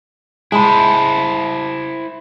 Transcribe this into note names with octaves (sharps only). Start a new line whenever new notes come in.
G#3 E4 C5 A5 B5